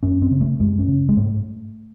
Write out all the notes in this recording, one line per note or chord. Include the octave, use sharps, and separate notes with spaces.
F#2 C#4
C4
C#3
A3
F#2 G#3
C#4
C#3
G#3
G#2 A3